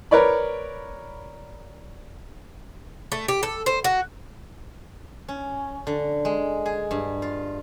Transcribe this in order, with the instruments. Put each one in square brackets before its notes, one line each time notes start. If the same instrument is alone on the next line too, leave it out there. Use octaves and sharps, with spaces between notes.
[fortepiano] A#4 B4 C#5 D5 B5
[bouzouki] A3
G4
A4
C5
F#4
[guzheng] C#4
D3
G#3
G#4
G2
F4